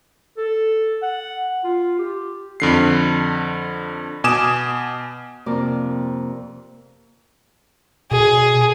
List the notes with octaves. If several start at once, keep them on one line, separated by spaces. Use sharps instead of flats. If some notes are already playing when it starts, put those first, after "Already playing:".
A4
F#5
F4
G4
F2 D3 C7
B2 G#5 D6 D#6 E7
F2 C3 A#3 A#4 D5 D6
B2 G#4